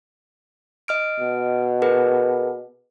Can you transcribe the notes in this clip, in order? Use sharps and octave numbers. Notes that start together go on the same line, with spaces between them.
D#5 F6 D7
B2
G#4 A#4 B4